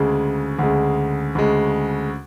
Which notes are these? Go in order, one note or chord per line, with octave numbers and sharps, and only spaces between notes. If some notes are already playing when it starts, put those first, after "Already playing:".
Already playing: D2 C#3 G#3
D2 C#3 G#3
D2 C#3 G#3